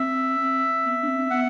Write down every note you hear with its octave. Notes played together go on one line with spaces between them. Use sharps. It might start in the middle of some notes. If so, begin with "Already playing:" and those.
Already playing: C4 E5
C4
B3
D4
C4
B3 F#5